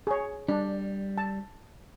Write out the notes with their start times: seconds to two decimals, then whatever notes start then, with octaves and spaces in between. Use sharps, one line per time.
0.07 G#4 C#5
0.49 G3 D4
1.18 A5